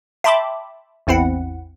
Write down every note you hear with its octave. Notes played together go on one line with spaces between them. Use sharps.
E5 G5 A5 B5 C6 D6
A1 E2 C4 E4 F#5